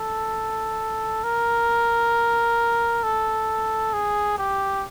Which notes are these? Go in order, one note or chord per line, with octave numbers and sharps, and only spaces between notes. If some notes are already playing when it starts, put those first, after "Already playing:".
Already playing: A4
A#4
A4
G#4
G4